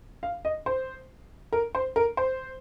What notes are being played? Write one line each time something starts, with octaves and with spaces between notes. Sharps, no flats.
F5
D#5
C5
A#4
C5
A#4
C5